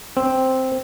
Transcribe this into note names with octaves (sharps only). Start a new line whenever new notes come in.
C4